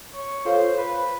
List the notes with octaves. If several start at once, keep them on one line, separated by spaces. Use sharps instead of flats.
C#5
F4 A4 C5 C#5 F5
B4